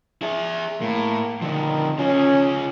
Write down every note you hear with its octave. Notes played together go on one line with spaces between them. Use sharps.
G#4 E5
A2 A#3
D3 D#3 F3
C#3 C#4 F4